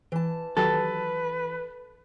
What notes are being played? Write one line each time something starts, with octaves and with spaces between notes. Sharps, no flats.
E3 A5
D#3 F#3 G4 A4 B4